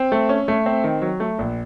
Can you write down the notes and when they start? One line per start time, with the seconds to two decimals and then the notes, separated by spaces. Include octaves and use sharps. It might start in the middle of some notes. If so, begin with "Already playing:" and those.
Already playing: C4
0.12 A3
0.29 C#4
0.48 A3
0.66 C4
0.84 D#3
1.02 F#3
1.20 A3
1.39 A#1